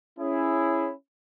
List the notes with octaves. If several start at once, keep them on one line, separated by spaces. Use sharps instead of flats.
C#4 E4 G#4